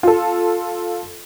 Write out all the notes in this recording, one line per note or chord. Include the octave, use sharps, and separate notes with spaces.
F4 A4